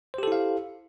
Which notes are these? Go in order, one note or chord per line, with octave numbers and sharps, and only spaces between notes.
E4 G4 A4 C5 F5